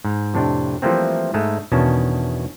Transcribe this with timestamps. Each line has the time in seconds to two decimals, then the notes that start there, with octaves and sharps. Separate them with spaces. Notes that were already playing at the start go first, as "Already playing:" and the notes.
0.05 G#2
0.34 F2 A2 C3 D4
0.82 E3 F3 G3 A3 A#3 C4
1.34 G#2 G#3 A3 A4
1.72 E2 B2 D#3 C#4 D4 A5